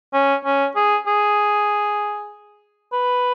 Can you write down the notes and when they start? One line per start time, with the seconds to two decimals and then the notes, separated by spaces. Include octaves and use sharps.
0.14 C#4
0.45 C#4
0.76 G#4
1.07 G#4
2.93 B4